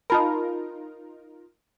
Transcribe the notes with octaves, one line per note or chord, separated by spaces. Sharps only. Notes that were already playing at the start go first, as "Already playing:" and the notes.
D#4 F4 A#4 A5 B5